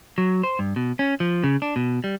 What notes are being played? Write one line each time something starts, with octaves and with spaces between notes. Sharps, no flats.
F#3
C5
G2
B2
C#4
F3
C#3
D4
B2
G3